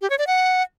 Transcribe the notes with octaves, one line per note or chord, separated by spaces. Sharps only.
G4
C#5
D5
F#5